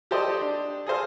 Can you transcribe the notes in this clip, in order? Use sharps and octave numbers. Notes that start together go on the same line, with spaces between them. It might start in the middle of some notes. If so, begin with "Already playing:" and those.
G4 A4 C5 D5 D#5
D4
G#4 A4 C5 F5